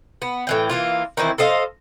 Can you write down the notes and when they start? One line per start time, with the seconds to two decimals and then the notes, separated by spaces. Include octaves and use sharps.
0.22 B3
0.47 A2 E3 G5
0.69 E3 A#3 F4
1.17 D#3 E3 C4 E4
1.38 A4 C5 D#5 F5